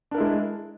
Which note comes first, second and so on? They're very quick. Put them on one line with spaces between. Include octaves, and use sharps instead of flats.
D4 A#4 E4 G#3